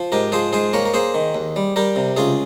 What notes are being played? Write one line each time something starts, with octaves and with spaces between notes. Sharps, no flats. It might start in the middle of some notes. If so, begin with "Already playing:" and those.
Already playing: F3
G#2 G4 A#4
F3 G#4 C5
G#2 G#4 C5
A#3 A#4 C#5
A#4
A#3 G#4 C5
D#3
D#2
G3
G3 G4 A#4
C3
C#2 F4 G#4